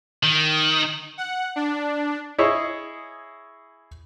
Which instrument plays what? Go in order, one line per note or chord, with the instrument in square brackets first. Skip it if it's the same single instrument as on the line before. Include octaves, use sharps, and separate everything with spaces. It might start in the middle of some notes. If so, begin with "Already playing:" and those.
[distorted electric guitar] D#3
[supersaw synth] F#5
D4
[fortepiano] E4 G#4 C#5 D#5